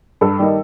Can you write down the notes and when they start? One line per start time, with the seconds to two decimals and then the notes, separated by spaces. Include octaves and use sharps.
0.21 G2 A4
0.39 D#3 G3 A#3 D#4